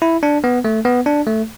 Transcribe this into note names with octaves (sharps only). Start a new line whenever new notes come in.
E4
D4
B3
A3
B3
D4
A3